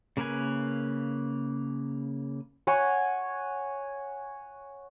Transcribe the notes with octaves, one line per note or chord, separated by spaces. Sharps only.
C#3 A#3 A#4 B4 G#5
C#5 F#5 G#5 C#6